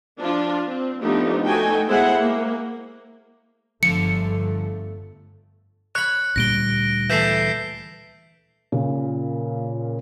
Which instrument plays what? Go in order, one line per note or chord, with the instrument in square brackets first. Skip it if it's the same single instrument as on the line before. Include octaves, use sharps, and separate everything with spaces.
[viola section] F3 D4 F4
C4
F3 A3 B3 D4 D#4 G4
A3 D#4 F#4 A4 G5 G#5
G#3 B3 E4 G#4 C5 F#5
A#3
[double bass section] G1 A3 [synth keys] D3 F3 [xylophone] C#7
[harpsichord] C#5 B5 [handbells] F#6
[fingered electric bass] D2 A#2 G3 [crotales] A#6 D7 G7
[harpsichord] E3 A3 [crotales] G6 B6 C7
[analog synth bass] A#2 [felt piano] C#3